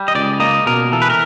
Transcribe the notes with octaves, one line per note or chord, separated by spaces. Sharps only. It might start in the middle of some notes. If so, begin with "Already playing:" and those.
Already playing: G3
D#5
C#2 D5
A#3 D#5
B2 A#4
E3 A4
B4
A#4